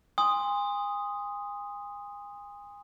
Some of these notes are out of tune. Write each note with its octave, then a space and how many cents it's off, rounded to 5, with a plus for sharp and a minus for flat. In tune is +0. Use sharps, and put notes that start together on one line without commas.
G#5 -35 C6 +0 D#6 +0